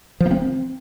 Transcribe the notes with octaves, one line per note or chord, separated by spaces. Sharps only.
F3
A#3
C4